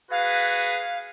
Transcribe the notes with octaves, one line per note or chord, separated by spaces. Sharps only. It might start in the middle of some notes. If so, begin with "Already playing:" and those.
F#4 G#4 B4 F5